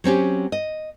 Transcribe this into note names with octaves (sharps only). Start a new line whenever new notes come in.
F#3 C4 C#4 G4
D#5